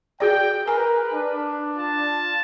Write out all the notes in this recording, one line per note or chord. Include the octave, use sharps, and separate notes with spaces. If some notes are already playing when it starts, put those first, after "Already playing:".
F#4 G#4 D5 G5
A#4 B4 G#5
D4
F4 A5